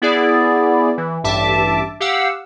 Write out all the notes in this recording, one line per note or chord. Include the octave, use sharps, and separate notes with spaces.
B3 E4 G#4 D5
E3
A1 G2 E5 A5 D6
G4 F5 F#5 E6